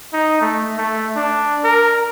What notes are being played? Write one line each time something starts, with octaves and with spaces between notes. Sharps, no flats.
D#4
A3
A3
D4
A#4